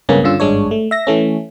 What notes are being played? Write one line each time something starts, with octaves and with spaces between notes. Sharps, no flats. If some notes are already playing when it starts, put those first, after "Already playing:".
C#2 G2 C#3 A#3 B3 C#4
G2 D3 C#4 F4 E6
G#1 G2 G#3 D4 C#5
A3
E5 A#6
E3 A3 C#4